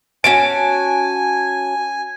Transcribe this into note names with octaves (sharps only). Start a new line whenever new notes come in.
C#4 F#4 G#5 A5 D7